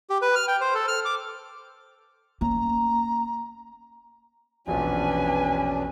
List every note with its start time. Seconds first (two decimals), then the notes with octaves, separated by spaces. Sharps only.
0.10 G4
0.22 B4
0.35 F6
0.48 G5
0.61 C5
0.74 A4
0.88 F6
1.05 D6
2.41 A#3 C#4 A#5
4.67 E1 A#1 C#4 D4 F4 B4 G#5